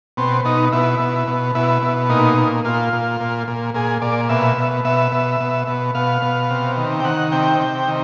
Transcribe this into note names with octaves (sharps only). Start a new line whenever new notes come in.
B2 C4
B2 D#4
B2 E4
B2
B2
B2 E4
B2
A#2 D#4
A#2
A#2 F4
A#2
A#2
A#2
A#2 G#4
A#2 D5
B2 E5
B2
B2 E5
B2
B2
B2
B2 F5
B2
C3
D#3
G5
D#3 F#5
C3 G5
C3
D#3